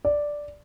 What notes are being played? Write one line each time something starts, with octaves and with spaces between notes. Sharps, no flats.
D5